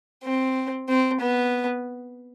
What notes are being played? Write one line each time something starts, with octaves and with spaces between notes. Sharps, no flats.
C4
C4
B3